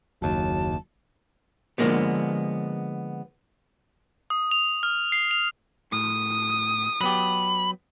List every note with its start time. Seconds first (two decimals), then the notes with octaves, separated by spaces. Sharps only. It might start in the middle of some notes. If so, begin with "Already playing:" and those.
0.22 F#1 D#2 F#3 A5
1.78 D3 F3 G#3 A#3 B3
4.30 D#6
4.51 F7
4.83 F6
5.12 C7
5.31 F7
5.92 A2 D#6
7.01 F#3 B3 G4 B5